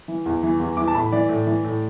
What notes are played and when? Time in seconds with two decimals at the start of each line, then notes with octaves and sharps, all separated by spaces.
0.08 E3
0.26 E2
0.43 E3
0.60 E2
0.77 E3 D6
0.88 A5
0.95 A2 B5
1.12 E3 D5
1.29 A2
1.47 E3
1.64 A2